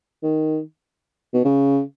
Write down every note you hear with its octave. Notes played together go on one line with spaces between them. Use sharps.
D#3
B2
C#3